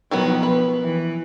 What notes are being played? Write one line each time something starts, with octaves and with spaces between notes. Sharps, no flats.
B2 D#3 F3 F#3 B3
B4
E3